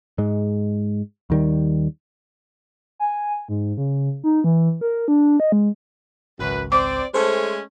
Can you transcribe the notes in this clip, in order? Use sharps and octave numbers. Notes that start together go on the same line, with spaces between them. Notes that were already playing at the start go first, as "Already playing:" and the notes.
G#2 G#3
D#2 D#3 G3
G#5
G#2
C#3
D#4
E3
A#4
D4
D#5
G#3
G#1 C#2 F#2 B4
C4 C5 D5 D6
G#3 A3 C#4 A4 C5